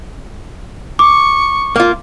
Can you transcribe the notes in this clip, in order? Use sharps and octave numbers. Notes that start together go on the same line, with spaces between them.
C#6 D6
A#3 F4